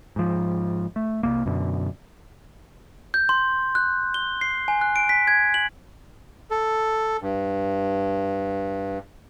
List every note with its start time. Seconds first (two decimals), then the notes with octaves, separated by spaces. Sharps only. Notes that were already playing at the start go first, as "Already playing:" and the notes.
0.16 G#2 F3
0.96 A3
1.23 C2 F#2 A#3
1.46 F#2 B2 D3
3.14 G6
3.29 C6
3.75 F#6
4.14 G7
4.41 C7
4.68 G#5
4.81 F#6
4.96 D7
5.09 B6
5.28 G#6
5.54 F#7
6.51 A4
7.22 G2